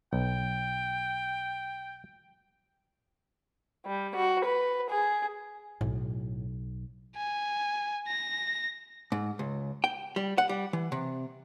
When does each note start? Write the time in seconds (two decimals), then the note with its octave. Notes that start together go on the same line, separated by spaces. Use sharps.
0.13 B1 G5
3.85 G3
4.15 F#4
4.45 B4
4.90 G#4
5.81 B1 A2
7.16 G#5
8.08 A#6
9.12 G#2
9.39 C#2
9.84 G5
10.16 G3
10.38 F#5
10.49 G3
10.73 E3
10.92 C3